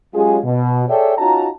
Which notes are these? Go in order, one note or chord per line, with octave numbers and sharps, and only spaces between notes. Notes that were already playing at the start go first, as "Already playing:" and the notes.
F#3 G#3 C#4 F4 G4 G#4
B2
G#4 A4 C#5 D5 E5 G5
C#4 D#4 F4 F#4 A5 A#5